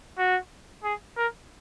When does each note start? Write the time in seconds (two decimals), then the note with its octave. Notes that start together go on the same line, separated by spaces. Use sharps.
0.18 F#4
0.84 G#4
1.17 A#4